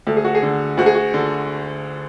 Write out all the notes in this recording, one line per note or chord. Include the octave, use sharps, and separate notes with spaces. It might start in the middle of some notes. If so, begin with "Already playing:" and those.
D2 A4
G#4
F#4
G#4
D3
D2 F#4
G#4
F#4
D3